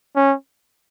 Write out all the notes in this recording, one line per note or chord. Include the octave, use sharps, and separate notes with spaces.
C#4